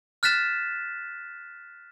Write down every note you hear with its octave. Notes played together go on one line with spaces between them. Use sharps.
F6 F#6 A6 B6 E7